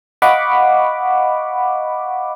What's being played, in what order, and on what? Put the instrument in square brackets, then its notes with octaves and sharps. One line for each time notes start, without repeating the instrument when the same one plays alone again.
[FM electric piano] D#5 F5 F#5 B5 C#6 D6